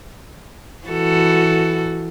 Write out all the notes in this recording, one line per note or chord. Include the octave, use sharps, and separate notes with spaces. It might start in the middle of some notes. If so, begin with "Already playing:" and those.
E3 F#4 A4